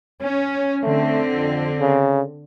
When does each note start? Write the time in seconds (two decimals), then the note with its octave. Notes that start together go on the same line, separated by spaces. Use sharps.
0.20 C#4
0.83 D3 A3 C4
1.34 F2
1.80 C#3